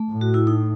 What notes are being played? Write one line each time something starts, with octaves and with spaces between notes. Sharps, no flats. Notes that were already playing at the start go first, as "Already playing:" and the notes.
Already playing: A3
A2
F#4
E4
D#4